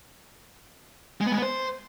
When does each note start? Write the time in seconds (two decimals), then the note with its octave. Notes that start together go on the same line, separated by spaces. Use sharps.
1.21 G#3
1.26 B3
1.32 G#3
1.37 B3
1.42 C5